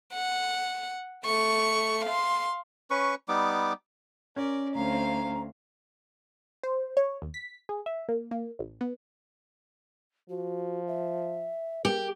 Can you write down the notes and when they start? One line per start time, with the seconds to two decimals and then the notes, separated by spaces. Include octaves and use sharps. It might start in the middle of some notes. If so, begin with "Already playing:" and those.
0.13 F#5
1.25 A3 C#6
2.05 F5 C6
2.90 C#4 B4 C#6
3.28 G3 B3 D#4 D6
4.36 C#4 A#4 D5
4.75 D2 C4 F5 A#5
6.63 C5
6.97 C#5
7.22 D#2
7.34 B6
7.69 G#4
7.86 E5
8.09 A#3
8.31 A#3
8.59 A1
8.81 B3
10.30 F3 F#4
10.87 E5
11.85 G4 A#4